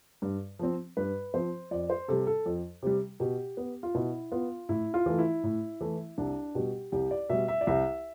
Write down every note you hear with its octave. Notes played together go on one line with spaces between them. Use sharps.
G2
F3 C4
G2 B4
F3 C4 C5
F2 D5
C5
C3 G3 A4
A4
F2
C3 G3
B2 G4
B3
F4
B2 E4
B3 F4
A2 E4
F4
E3 A3
E4
A2
E3 A3
C2 D4
B2 G3 G4
C2 G4
D5
B2 G3 E5
E5
D5
C2 E5